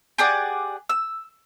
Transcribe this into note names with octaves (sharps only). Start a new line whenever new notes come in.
G4 G#4 D5 F#5
E6